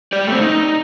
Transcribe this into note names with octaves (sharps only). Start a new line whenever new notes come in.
G4 D5
A3 C4
D#4